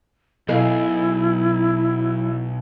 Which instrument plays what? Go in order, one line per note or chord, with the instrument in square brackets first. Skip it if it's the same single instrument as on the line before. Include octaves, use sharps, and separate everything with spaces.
[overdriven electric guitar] B1 [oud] B2 G#4 F5 [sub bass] F#3 [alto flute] E4